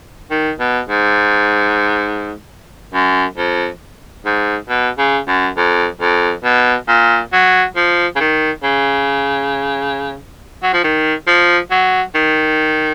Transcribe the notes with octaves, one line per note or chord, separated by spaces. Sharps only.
D#3
B2
G#2
F#2
F2
G#2
B2
C#3
F#2
F2
F2
B2
A#2
F#3
F3
C#3
D#3
C#3
F#3
F3
D#3
F3
F#3
D#3